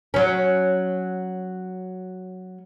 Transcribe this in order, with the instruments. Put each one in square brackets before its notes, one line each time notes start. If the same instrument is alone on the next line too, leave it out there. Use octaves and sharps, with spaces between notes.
[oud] F#3 C#4